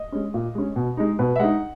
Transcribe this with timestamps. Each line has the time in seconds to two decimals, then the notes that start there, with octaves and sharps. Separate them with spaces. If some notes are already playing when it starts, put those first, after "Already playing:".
Already playing: D#5
0.12 G#3 C#4
0.34 A#2
0.55 G#3 C#4
0.76 B2
0.97 G#3 D#4
1.19 B2 B4
1.36 E5
1.39 G#3 D#4 F#5